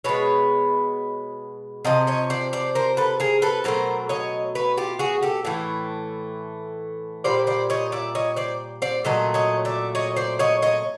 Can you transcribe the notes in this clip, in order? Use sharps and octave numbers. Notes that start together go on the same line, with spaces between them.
B2 G#3 B4 C#5
C3 F3 D#5
C#5 D#5
C5 D5
C5 D5
A#4 C5
A4 B4
G#4 A#4
A4 B4
B2 F#3 A3 A#4 C5
C#5 D#5
B4 C#5
F4 G4
F#4 G#4
G4 A4
A2 E3 A3
A#2 G3 C5 D5
C5 D5
C#5 D#5
D5 E5
C#5 D#5
C5 D5
C5 D5
A#2 F#3 A3 D#5
C#5 D#5
D5 E5
C#5 D#5
C5 D5
C#5 D#5
C#5 D#5